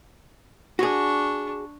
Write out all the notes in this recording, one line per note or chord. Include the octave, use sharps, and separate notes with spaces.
D4 F#4 G#4 C#6